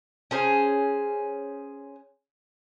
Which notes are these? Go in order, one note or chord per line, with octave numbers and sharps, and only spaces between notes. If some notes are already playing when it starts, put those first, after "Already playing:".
C#4 G#4 C5